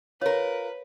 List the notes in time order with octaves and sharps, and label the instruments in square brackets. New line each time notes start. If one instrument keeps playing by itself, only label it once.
[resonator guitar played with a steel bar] F4 A#4 [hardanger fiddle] B4 [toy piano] C#5